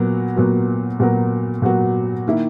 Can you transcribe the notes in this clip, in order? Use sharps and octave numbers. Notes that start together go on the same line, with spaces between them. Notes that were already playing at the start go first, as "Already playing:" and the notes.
Already playing: A#2 F#3 B3 F#4 A#4
A#2 F#3 B3 F#4 A#4
A#2 F#3 B3 F#4 A#4
A#2 F#3 B3 F#4 A#4
D#3 A#3 E4